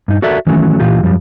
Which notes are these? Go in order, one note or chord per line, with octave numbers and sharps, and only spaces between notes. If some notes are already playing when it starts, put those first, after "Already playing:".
G2 D#4
F#4 A4 A#4 D5 E5
D#3 E3 F#3 A3 C#4
A#2 E3 F4 G4
F#2 F3 G3